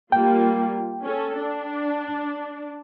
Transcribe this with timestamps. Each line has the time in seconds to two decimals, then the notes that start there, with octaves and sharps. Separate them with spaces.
0.12 G3 A#3 F4 G5
1.03 C#4 A4
1.37 D4